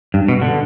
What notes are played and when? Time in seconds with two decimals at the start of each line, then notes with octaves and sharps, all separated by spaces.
0.14 G2
0.28 B2
0.42 D3